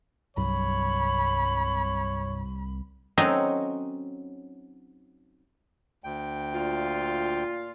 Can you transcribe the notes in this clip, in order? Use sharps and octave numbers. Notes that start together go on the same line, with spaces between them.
C2 G2 F#3 C#5 B5
F#3 C4 C#4 D#4 A4 D#5
D2 G5
A#2 F4